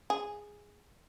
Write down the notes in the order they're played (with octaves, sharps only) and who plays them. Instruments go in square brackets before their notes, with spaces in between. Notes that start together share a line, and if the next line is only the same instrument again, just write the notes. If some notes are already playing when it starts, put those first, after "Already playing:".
[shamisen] G#4